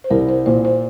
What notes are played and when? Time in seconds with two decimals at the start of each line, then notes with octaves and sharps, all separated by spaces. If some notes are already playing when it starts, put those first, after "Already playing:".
0.04 C5
0.10 C2 A#4
0.29 C5
0.46 A#2 C5
0.65 C5